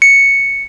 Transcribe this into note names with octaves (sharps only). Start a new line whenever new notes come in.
C#7